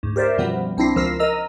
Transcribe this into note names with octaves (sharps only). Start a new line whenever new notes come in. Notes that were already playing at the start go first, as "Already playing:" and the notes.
D2 G#2
G4 A#4 C5 D5 E5
F#2 B2 E3 F3 G3 B3
B1 C4 D4 E4 A#6 C7
C#2 F3 A#4 E6 A#6 C7
A#4 D#5 A#5 E6